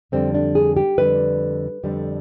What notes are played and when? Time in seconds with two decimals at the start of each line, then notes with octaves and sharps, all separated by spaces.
0.12 F2 D3 G3 C4
0.34 D4
0.55 G#4
0.77 G4
0.98 F2 D3 G3 B4
1.84 F2 D3 G3